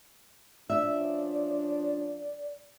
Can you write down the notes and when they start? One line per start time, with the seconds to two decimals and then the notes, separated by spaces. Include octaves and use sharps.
0.70 F3 C#4 D4 D5 E5